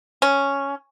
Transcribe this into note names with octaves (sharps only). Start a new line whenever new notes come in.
C#4